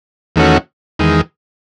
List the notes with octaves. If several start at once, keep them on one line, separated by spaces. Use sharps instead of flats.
E2 D#3 A3 C#4 F#4
E2 D#3 G#3